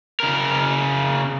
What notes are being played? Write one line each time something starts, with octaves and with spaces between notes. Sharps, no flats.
C#3 A#4